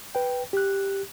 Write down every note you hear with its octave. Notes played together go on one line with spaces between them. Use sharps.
B4 G5
G4 F#6